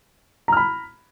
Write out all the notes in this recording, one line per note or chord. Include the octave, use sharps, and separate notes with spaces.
A#5 B5 F6